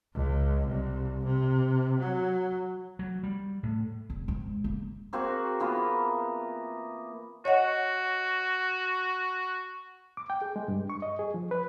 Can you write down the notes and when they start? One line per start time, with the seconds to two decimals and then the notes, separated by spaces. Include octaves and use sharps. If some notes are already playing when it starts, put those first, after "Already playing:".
0.14 C#2
0.67 C2
1.26 C3
2.00 F#3
2.99 F#3
3.23 G3
3.63 A2
4.10 E1
4.28 G#2
4.64 A#3
5.13 A#3 C4 F#4 G#4
5.60 E3 A#3 B3 F4
7.45 F#4 C#5 D#5 F#5
10.17 D6
10.30 G5
10.42 G#4
10.56 G#3
10.68 G2
10.90 C#6
11.02 D#5
11.19 G#4
11.34 F3
11.51 B4